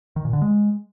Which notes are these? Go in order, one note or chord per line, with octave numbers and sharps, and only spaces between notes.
D#3
A#2
D3
G#3